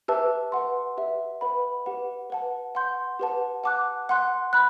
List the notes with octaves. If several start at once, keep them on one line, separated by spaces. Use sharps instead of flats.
G4 B4 E5 A5 E6
B4 F#5 C6
G4 B4 E5
B4 F#5 B5
G4 B4 F#5
B4 F#5 A5
F#5 C6 G6
G4 B4 F#5 A5
F#5 A5 D6 F#6
F#5 C6 F#6
B5 F#6